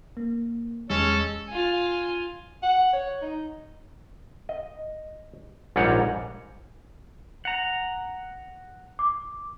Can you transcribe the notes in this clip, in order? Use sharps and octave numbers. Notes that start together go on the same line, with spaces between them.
A#3
E2 G#3 C#4 A4
F4 G#5
F#5
C#5
D#4
D#5
A#1 G#2 G3 C#5 F#5 A#5
F#5 A#5
D6